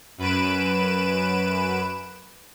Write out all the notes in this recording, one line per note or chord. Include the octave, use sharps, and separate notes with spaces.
F#2 B4 D7 E7